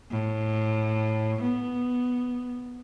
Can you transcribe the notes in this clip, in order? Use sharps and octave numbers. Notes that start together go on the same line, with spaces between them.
A2
B3